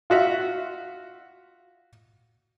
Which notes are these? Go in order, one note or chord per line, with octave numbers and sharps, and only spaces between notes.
F4 F#4 E5